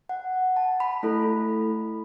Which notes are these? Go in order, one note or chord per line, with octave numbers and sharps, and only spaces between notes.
F#5
A5
B5
A3 E4 A4